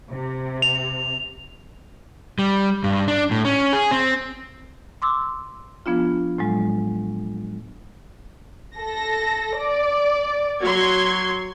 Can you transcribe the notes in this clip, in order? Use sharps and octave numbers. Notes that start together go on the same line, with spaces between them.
C3
F7
G3
G2
D4
A2
C#4
G#4
C4
C6 D6 E6
F3 B3 D4 F4
A2 F#3 G#3
A4 A#6
D5
F#3 C6 G#6